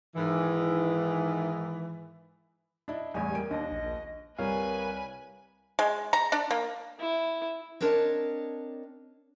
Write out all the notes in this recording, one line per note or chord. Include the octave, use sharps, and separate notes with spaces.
G#2 D#3 E3
D4 E4 D#5
A1 E2 G3 G#5
A#3 D7
D#2 D4 D#5
A#1
C2 A#4 B4 C#5 F5 G#5
G#3
A#5
D4
A#3
E4
C4 D4 A#4 C#5 D#5 A5